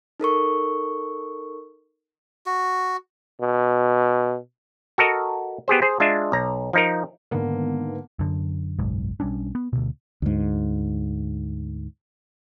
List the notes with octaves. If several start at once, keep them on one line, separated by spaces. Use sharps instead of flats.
D#4 A4 A#4 C#6
F#4
B2
F#4 A4 A#4 D#5
B3 G4 G#4 C5
G#4 C5
G#3 D4 F4 E5
B1 A#5
F3 D#4 A#4
G#2 D3 D#3 A#3 B3
F#2 D3
F#1 B1 G#2
B1 G3 C#4 D4
B3
D2 B2
D2 G#2